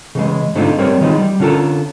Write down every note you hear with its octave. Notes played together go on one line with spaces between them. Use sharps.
C#3 E3 G#3
G#2 D3 A3 C4 D#4 F4
G3 C4 A#4 C5 C#5
D#3 F3 G#3 D#4 E4
G3
D3 C#4 F4 G4 A4 A#4